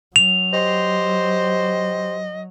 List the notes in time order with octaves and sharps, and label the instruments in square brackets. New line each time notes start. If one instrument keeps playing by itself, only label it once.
[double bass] F#3 [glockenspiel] F7
[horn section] G4 C5 [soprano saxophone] D#5